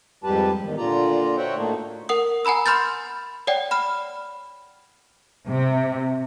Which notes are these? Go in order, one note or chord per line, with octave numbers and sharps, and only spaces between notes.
F2 G#2 G3 G4 B4 A5
E2 D#3
A#2 D3 F4 D5 A#5
F#4 C5 C#5 E5 F#5 G5
A2 A3 A#3 D4 D#4
A#4 F#5 D#6
F#5 G#5 A#5 B5 E6
B5 C6 F6 G6 A6
C#5 D5 F#5 G5
B5 F6 E7
C3